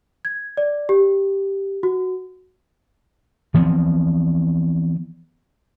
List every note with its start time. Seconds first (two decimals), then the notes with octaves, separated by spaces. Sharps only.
0.25 G#6
0.57 D5
0.89 G4
1.83 F#4
3.54 E3 F3 B3 C4